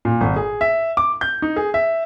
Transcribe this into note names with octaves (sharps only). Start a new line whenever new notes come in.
A#2
G#1
G#4
E5
D6
G6
D#4
G#4
E5